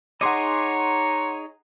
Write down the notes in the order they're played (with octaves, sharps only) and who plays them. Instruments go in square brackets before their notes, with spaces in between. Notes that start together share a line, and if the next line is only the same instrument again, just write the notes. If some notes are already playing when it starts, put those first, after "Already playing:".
[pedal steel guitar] D#4 G#4 D#5 [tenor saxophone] C#5 [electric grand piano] F#5 C6 D6 [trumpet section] A#5